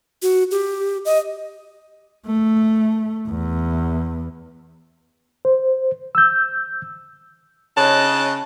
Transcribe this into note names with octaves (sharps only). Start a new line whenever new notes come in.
F#4
G4
D#5
A3
E2
C5
E6 G6
C#3 C#5 D#5 A5 F#6